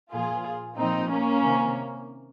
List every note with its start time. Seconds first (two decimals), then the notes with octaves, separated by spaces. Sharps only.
0.11 A#2 F3 F4 G#4
0.76 A#2 F3 C4 D#4
1.09 A#3 C#4
1.43 C3 D#3